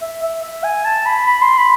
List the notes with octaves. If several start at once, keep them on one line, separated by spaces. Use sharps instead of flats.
E5
E5
E5
G#5
A5
B5
B5
C6
B5